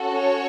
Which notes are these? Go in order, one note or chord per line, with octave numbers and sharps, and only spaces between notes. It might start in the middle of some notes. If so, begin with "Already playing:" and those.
Already playing: C#4 F#4 A4
C#5